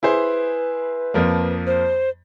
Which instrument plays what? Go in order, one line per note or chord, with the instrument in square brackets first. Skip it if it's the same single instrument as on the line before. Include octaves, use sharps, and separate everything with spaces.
[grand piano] E4 G#4 C5 [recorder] B4
[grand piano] F2 F3 A#3
[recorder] C5